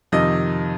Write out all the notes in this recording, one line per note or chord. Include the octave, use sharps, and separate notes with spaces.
F2 C3 D#3 D#5